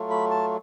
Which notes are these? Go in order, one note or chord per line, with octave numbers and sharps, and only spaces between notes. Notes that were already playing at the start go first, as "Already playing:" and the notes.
Already playing: F#3 A3 F4
B5
A5